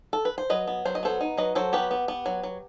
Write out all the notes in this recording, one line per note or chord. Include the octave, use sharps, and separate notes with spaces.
A4
B4
C5
F#3 B4 D#5
B3
F#3 C5
D#5
B3 A4 C5
D#4
F#3 B4 D#5
F#3 A4 C5
B3 G4 B4
B3
B3
F#3
F#3